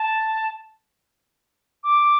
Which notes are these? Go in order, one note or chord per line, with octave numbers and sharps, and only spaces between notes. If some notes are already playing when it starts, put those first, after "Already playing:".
Already playing: A5
D6